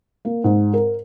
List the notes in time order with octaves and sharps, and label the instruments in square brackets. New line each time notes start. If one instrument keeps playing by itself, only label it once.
[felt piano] A#3
G#2
A#4